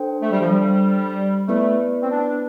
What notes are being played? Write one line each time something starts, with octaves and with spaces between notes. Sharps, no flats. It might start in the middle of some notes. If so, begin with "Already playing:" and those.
Already playing: D4 A4 C5 G5
A3
G3
F3
G3
A3 B3 E4 B4 D5
C4
D4